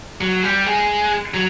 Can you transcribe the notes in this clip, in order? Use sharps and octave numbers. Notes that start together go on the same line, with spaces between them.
F#3
G3
G#3
F#3